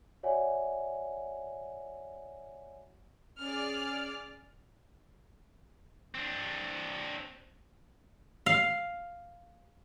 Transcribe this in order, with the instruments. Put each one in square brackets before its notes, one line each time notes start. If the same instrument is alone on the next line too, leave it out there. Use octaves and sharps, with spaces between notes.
[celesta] F#4 C#5 D5 E5 F#5 G#5
[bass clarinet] C#4 [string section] G#4 D5 F6
[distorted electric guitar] C4 D4
[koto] F5